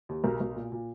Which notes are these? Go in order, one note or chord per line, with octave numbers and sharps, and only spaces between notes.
D#2
B1 A#4
B1
A#2
A#2